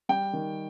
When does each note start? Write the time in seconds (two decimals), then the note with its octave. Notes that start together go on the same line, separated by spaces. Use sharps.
0.09 G3 G5
0.33 D#3